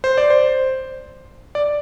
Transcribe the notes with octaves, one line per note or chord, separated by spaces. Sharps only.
C5
D5
C5
D5